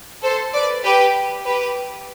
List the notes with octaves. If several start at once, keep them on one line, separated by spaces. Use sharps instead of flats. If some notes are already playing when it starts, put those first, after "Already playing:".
A4 C5
B4 D5
G4 B4
G4 B4